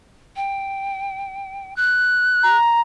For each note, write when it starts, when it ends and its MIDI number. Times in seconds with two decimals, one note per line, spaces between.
0.36 1.74 79
1.76 2.57 90
2.43 2.81 82